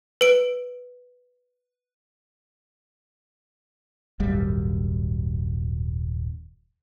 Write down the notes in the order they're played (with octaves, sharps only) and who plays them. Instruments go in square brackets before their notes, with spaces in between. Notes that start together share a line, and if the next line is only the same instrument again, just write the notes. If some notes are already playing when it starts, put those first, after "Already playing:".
[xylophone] B4 D7
[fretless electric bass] D#1 G#1 F#2 G3